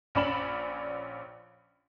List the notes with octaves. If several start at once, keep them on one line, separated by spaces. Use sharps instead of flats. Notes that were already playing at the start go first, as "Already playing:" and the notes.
A#1 C#4 D5 B5 E7 F#7